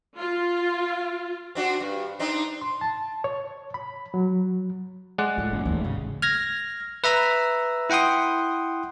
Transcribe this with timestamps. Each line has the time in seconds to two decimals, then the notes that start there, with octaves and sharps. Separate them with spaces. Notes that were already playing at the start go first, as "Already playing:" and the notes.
0.17 F4
1.55 C4 D4 F#4
1.80 G2
2.19 C4 D4 D#4
2.61 C6
2.81 A5
3.24 C#5
3.74 B5
4.14 F#3
5.18 G#3 D5 F#5
5.38 A2 F4
5.53 F#1
5.65 D#2 E3 A3
5.84 G#1 C#3
6.22 F6 G#6 A#6
7.04 B4 E5 A#5 E6
7.90 E4 F#5 G5 C6 D#6